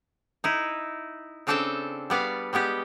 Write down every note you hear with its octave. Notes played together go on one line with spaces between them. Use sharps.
D#4 E4
C#3 C4 D4 A4 G5 A5
G3 B3 D5 F5
G3 G#3 B3 G4